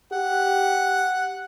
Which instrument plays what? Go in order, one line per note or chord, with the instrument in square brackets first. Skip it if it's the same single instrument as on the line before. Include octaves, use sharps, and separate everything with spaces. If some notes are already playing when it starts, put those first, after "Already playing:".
[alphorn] G4 [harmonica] F#5